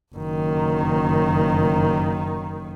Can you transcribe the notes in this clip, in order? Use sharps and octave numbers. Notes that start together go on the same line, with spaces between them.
F#1 D#3